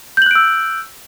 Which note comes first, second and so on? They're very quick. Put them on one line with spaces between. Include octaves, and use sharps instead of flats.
G6 F#7 F#6 D7 E6